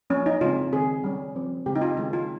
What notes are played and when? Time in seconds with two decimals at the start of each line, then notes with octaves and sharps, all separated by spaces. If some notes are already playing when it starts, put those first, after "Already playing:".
0.10 F3 A#3 C#4
0.26 D#4
0.41 C#3 G#3 C4 F4
0.73 D#3 G#3 C4 G#4
1.04 G3 C#4
1.35 F3 C4
1.66 C#3 G#3 C4 G4
1.75 D#4
1.81 F4
1.97 D#3 G#3 C#4 D#4
2.13 F4